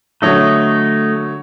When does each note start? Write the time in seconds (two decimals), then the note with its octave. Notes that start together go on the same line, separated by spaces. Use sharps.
0.22 D3 F#3 A3 C#5 D#5